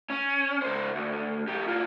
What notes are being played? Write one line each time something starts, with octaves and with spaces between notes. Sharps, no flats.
C#4
C#2 C5
D2
B1 G4
B2 F4